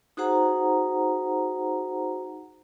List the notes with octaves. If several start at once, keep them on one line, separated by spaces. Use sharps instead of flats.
D#4 F#4 G#4 C5 F#5 A#5